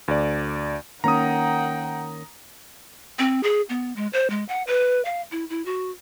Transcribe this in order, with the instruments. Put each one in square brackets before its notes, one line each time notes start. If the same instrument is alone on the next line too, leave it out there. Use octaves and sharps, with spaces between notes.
[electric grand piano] D2 D5
[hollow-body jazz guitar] D#3 A#3 C#4 [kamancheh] F#5 G5 [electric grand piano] A#5 D#6
[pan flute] C4
G#4
B3
G#3
C5
G#3
F#5
B4
F5
E4
E4
F#4